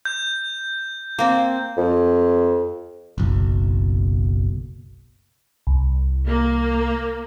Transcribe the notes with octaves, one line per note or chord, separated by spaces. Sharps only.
G6
A#3 C4
F2
F#1 B1
C2
A#3